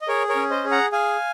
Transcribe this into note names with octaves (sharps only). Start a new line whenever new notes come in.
D#5
G#4 A#4 C#5
A#4 C#5
C#4
C5 D#5
G#4
F#5 A#5
G#4 F5 G#5